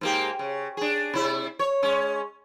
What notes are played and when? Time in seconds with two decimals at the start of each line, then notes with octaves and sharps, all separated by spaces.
0.01 G#2 A#3 G4
0.39 C#3
0.77 D4 G#4
1.14 C3 E4
1.59 C#5
1.82 G#3 C#4